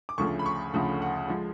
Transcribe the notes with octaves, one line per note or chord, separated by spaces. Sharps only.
D6
D2 C#3 F3 A3 C#6
B5
C#6
D2 C#3 F3 A3 F#5
F#5
F3 G#3